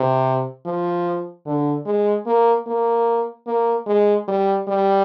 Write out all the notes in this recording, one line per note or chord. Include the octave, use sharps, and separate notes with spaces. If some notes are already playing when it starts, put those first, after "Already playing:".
Already playing: C3
F3
D3
G#3
A#3
A#3
A#3
G#3
G3
G3